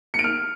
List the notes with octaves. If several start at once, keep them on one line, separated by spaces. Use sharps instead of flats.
C#7
D7
F6